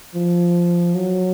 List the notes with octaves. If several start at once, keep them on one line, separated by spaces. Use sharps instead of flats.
F3
F#3